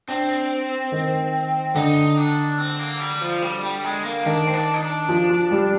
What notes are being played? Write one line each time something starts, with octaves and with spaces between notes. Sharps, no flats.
C4 D4
D#3
D3 D#4
D4
C4
A#3
G3
F3
G3
G3
G#3
A#3
D#3 D4
C4
D4
D#4
D4
F3
F3
G3